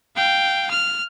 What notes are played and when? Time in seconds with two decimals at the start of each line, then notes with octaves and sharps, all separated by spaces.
0.16 F5 G5
0.70 F6